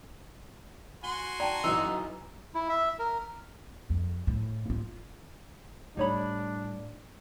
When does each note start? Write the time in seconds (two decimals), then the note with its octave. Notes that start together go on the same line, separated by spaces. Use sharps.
1.04 F#4 G#5 C6 G7
1.40 D5 G5 A5 A#5
1.64 B1 F#2 E3 D#4 E6
2.55 E4
2.69 E5
2.99 A#4
3.90 F2
4.27 A2
4.70 F4
5.97 A2 G3 D4 D#4 C#5 B5